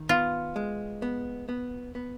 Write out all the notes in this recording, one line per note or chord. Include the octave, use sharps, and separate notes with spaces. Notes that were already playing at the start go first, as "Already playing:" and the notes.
Already playing: D#3
B3 F4
G#3
B3
B3
B3